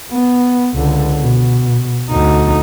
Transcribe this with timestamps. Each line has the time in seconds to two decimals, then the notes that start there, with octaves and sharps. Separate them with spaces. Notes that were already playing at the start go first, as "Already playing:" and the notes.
0.12 B3
0.75 C#2 D3
1.20 B2
2.11 D2 D#4